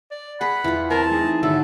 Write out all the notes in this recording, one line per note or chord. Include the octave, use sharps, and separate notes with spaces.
D5
G#4 B4 F#5 B5
E2 E3 F4
C4 A#4 C5 A5
A3 D#4 G#4
G#1 D3 F#3 A4 E5